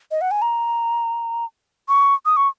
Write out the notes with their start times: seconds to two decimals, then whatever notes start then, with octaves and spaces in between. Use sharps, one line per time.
0.11 D#5
0.21 F#5
0.31 G#5
0.42 A#5
1.88 C#6
2.26 D#6
2.37 C#6